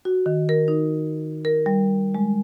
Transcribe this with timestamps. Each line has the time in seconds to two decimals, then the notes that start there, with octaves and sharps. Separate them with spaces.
0.05 F#4
0.26 D#3
0.49 A#4
0.68 D#4
1.45 A#4
1.66 G3
2.15 G#3